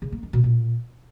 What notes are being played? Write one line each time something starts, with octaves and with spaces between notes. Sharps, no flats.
C#3
A#3
D#3
B2
A#2